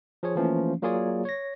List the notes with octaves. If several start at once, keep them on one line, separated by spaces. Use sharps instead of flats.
F3 G#4 C#5
E3 F3 A3 A#3 C#4
F#3 A#3 F4 G#4 C#5 D5
C#5 A#6